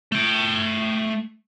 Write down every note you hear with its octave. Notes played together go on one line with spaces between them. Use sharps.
A3 G5